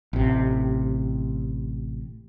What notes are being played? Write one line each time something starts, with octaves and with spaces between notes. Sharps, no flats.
A1 C3